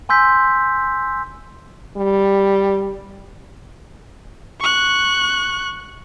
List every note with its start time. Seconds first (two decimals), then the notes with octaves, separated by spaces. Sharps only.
0.09 G#5 C6 E6 G6 B6
1.97 G3
4.61 C#6 F#6